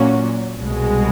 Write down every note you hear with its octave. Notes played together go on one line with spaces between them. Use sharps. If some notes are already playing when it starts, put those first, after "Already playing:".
Already playing: A#2 F#3 A#3 C#4 F#4
C2 B2 G#3